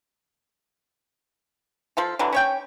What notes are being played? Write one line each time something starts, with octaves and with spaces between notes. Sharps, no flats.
F3 F4 A4
D3 E3 F#3
C#4 C#5 G5